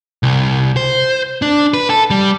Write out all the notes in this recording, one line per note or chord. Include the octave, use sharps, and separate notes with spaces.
C2
C5
D4
B4
A4
G3